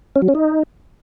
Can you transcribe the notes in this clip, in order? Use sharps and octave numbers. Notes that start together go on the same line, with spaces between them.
C#4
F#3
C#4
D#4